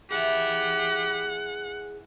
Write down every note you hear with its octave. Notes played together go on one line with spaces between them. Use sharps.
E3 E4 G4 G#4 E5 F#5